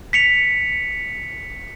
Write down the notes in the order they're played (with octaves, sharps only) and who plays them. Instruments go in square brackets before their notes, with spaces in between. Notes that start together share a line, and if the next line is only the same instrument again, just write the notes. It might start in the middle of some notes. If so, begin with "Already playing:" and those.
[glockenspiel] B6 C#7 F7